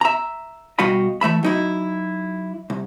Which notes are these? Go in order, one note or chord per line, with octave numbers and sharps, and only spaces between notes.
E5 A#5
B2 G3 F#4 D#5 F5 B5
E3 A3 E5 B5
F#3 D#4 E4
C2